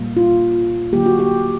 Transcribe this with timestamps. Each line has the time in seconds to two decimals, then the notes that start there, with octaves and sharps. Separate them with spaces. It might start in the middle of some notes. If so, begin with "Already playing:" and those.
Already playing: A#2 G3 A#3
0.17 F4
0.93 D3 F#3 A#3 G4
1.06 F#4
1.19 G4